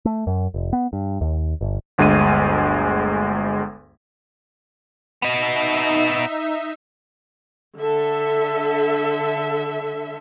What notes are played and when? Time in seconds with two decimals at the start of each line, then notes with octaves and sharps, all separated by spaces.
0.05 A3
0.27 F#2
0.54 F1
0.73 B3
0.93 G2
1.21 D#2
1.61 G1
1.98 G1 D2 G#3 G#4 D#7
5.22 B3 D#4 D#5 E5
7.79 D3 A4 E5